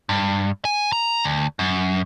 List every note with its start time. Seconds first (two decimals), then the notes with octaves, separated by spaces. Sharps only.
0.09 G2
0.65 G#5
0.92 A#5
1.24 D2
1.59 F#2